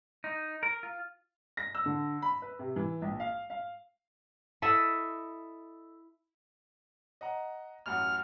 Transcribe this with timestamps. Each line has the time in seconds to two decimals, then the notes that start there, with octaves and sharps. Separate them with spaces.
0.24 D#4
0.63 A#4
0.83 F4
1.57 A#6
1.75 E6
1.86 D3
2.22 B5
2.42 B4
2.59 C3
2.76 E3
3.02 A#1
3.20 F5
3.50 F5
4.62 E4 A4 D#5 E5
7.21 D#5 F#5 A#5
7.86 A1 F#2 F#5 F6